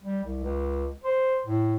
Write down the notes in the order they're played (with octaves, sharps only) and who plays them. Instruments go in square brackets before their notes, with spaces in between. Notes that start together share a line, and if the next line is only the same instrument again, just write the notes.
[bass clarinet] G3
C2
C#2
C5
A2